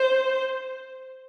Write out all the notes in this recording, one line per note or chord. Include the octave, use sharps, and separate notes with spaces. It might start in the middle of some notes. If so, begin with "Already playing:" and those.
Already playing: C5